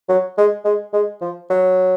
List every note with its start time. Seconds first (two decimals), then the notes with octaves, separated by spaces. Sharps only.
0.09 F#3
0.38 G#3
0.65 G#3
0.93 G#3
1.21 F3
1.50 F#3